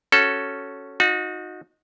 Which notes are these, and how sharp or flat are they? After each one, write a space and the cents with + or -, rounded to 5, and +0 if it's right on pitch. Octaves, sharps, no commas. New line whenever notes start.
C#4 +0 F#4 +10 A4 +0
D#4 +0 F#4 -30